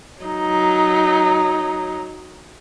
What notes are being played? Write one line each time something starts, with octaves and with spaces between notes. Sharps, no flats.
F#3 D#4